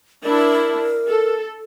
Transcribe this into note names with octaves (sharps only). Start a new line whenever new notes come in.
D4 E4 A#4
A4